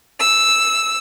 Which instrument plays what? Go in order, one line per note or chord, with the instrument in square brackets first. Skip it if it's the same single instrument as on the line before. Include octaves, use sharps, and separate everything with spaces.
[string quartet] E6